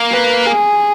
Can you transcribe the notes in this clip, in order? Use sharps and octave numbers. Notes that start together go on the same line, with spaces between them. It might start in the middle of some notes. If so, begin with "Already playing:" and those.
Already playing: A#3
B4
G#4